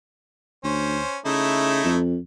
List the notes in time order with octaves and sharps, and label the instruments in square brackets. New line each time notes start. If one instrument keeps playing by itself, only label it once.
[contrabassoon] D2 [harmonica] C#4 C5
[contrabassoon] C#3 [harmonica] A3 D#4 E4
[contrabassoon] F2